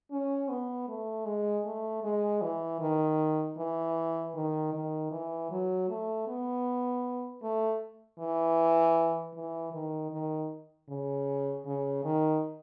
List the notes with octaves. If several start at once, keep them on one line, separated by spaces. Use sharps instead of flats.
C#4
B3
A3
G#3
A3
G#3
E3
D#3
E3
D#3
D#3
E3
F#3
A3
B3
A3
E3
E3
D#3
D#3
C#3
C#3
D#3